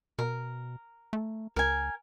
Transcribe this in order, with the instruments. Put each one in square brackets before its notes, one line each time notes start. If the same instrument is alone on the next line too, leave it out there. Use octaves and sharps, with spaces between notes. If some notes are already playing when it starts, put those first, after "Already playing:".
[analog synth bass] B2 [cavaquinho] A#4
[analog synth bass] A3
[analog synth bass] C#2 [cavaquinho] A#4 G#5